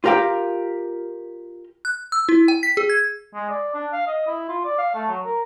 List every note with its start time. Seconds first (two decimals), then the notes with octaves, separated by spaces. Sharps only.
0.04 F4 G4 A#4 F5 G5
1.85 F#6
2.12 E6
2.29 E4
2.48 G5
2.63 B6
2.77 G#4
2.90 G#6
3.34 G#3
3.49 D5
3.74 D4
3.92 F5
4.07 D#5
4.27 E4
4.49 F4
4.65 D5
4.78 F5
4.95 A3
5.08 F#3
5.25 A#4